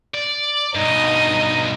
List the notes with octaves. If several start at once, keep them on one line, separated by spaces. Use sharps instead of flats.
D5
G2 B2 D#4 D#5